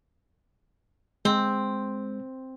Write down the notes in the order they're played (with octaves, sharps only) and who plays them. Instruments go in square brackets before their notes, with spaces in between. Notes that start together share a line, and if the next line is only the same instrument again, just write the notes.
[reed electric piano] G#3 [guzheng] C4